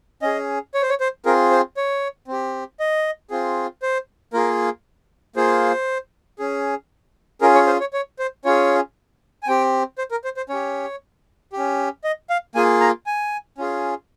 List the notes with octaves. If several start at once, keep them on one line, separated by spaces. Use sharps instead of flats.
C#4 G#4 D#5
C#5
C5
C#5
C5
C4 F4 G#4 A#4
C5
C#5
C4 G4
D#5
C4 F4 G#4
C5
A#3 F4 G#4 A#4
A#3 F4 G#4 C5
C#4 G#4
C#4 F4 G#4 A#4
C#5
C5
C#5
C#5
C5
C#4 F4 G#4 C#5
G#5
C4 G4 G5
C5
A#4
C5
C5
C#4 G4 C#5
C#4 G4
D#5
F5
A#3 F4 G#4 G#5
A#5
G#5
C#4 F4 G#4